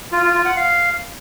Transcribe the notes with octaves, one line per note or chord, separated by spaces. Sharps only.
F4
F4
F4
F#5
F5